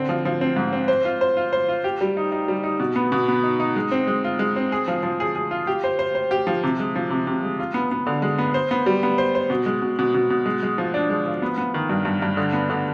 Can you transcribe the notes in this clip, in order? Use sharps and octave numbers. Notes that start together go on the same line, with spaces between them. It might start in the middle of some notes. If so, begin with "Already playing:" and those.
Already playing: D3 C4
F3
F3
C4
G#2
C4
C5
F4
C5
F4
C5
F4
G4
G3
D#4
D#4
G3
D#4
B2
B3
B2
B3
D#4
D#4
G#3
C4
G#3
F4
G#3
C4
G#4
F3
F3
G#4
G#4
F4
G4
C5
C5
C5
G4
F3
C3
G#3
F3
C3
C3
G#3
F4
B3
B3
D3
G#3
B3
C5
B3
G3
B3
C5
C5
B2
G#3
B2
B2
B2
B2
G#3
G#3
F3
D4
G#3
F3
B3
B3
D#3
G2
G2
G2
D3
B3
D3